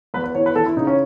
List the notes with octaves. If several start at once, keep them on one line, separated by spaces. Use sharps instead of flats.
E2 B4
B4
E3 C#5
B4
E3 A4
E4
C#3 D#4
C#4